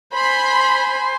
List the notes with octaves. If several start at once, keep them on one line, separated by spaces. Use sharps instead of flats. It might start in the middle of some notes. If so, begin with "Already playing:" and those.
C5 G#5 B5 C6